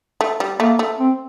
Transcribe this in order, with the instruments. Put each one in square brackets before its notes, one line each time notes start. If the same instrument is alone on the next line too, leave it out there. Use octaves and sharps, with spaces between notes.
[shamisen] A3
G3
[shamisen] A3 [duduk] A#3
[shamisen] A3
[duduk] C4